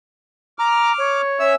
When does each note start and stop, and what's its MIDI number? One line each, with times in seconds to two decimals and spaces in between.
0.59 0.92 82
0.59 1.22 86
0.59 1.22 89
0.98 1.54 73
1.40 1.55 61
1.40 1.55 76
1.40 1.55 88